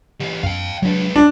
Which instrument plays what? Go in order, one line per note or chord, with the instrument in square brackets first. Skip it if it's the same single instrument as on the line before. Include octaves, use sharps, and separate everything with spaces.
[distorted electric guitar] E3 G4
[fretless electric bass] F#2 [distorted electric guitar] F5 G5
[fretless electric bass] F#3 D4 [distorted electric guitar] G#3 B4
[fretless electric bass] C#4 [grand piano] D4